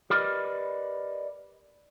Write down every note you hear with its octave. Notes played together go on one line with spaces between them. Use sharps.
G4 A#4 B4 D5 D#5